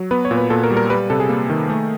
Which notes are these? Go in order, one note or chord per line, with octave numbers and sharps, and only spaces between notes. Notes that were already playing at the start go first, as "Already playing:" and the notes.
Already playing: F#3
B3 B4
C#5
A#2
B4
A#2 A4
A#4
G3
A#4
G3 B4
C3 A4
G#4
A#3
D#3
A3